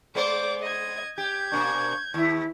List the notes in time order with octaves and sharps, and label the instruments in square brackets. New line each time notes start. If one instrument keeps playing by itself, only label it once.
[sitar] G#3 B3 C5 [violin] D5 D6
[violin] D#5 G#6
[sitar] G4 [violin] G6 G#6
[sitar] B2 A#3 D4 [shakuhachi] C#6
[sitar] D#2 [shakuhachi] E4